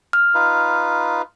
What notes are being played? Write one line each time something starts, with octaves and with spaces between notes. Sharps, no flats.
F6
D#4 F4 B4